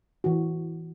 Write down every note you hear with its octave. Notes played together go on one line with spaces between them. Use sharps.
E3 F#4